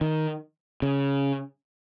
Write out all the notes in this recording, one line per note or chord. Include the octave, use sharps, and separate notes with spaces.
D#3
C#3